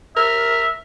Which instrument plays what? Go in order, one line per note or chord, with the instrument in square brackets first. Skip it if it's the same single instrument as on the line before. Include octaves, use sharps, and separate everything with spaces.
[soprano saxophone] A#4 [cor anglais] E5